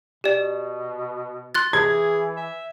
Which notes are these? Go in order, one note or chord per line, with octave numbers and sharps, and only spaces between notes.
B2 G4 D5
C6 F#6 A6
E3 G#4 G#6
E5